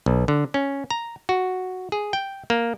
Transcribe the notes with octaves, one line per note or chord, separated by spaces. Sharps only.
B1
D3
C#4
A#5
F#4
G#4
G5
A#3